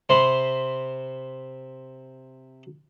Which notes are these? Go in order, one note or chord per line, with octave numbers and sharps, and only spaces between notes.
C3 C5 B5 C6